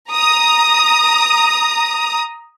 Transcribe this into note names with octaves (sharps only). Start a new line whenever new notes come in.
A#5 D#6